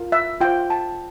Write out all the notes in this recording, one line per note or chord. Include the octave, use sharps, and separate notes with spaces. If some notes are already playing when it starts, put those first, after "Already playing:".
Already playing: F4 A#4
E5
F4 C5 G5
A5